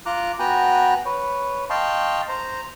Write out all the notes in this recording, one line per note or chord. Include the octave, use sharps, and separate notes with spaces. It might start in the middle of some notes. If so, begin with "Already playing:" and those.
F4 A#5 D6 F#6
B3 F#4 G5 G#5 A#5 F#6
B4 C#5
D#5 F5 G5 A5 C6 C#6
C5 A#5